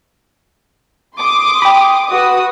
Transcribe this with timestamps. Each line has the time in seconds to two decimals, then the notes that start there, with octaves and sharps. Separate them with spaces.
1.16 C6 D6 D#6
1.62 G5 B5
2.08 F#4 B4 D#6